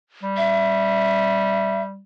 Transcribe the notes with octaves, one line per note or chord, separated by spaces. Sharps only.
G3
E5